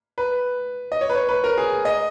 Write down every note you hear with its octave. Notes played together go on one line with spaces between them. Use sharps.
B4
D#5
C#5
B4
C#5
B4
A#4
G#4
D#5